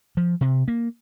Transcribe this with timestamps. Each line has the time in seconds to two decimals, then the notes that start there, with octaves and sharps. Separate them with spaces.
0.17 F3
0.41 C3
0.68 A#3